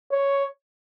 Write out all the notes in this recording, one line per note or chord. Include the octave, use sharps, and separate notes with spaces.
C#5